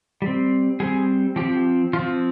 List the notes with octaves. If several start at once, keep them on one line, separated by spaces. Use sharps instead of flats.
G3 C4
G3 C4 G#4
F3 C4 G4
F3 C4 F4